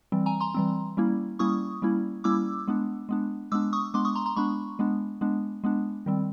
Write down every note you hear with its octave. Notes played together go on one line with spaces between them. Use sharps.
E3 G3 C4
G#5 A#5
A#5 C6
E3 G3 C4
G3 A#3 C#4 E4
G3 A#3 C#4 E4 C#6 D#6
G3 A#3 C#4 E4
G3 A#3 C#4 E4 D6 E6
G#3 B3 D4
G#3 B3 D4
G#3 B3 D4 D6 E6
C#6 D#6
G#3 B3 D4 C6 D6
C#6 D#6
A#5 C6
A#5 C6
G#3 B3 D4 B5 C#6
G#3 B3 D4
G#3 B3 D4
G#3 B3 D4
D#3 G3 C4